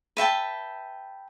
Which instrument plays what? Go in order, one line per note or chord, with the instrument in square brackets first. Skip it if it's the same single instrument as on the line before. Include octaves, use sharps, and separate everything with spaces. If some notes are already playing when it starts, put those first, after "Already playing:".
[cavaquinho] B4 E5 G5 A5